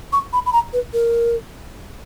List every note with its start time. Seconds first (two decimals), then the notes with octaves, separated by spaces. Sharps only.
0.13 C#6
0.33 B5
0.46 B5
0.53 A#5
0.73 B4
0.93 A#4